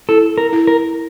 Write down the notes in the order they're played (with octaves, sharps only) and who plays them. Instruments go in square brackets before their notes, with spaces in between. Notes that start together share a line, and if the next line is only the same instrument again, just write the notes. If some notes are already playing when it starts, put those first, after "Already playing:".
[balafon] E4 [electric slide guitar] A4
[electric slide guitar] A#4
[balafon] E4
[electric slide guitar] A#4